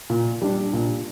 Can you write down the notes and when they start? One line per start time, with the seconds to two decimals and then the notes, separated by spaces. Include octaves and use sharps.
0.10 A#2
0.42 G3 D4
0.73 A#2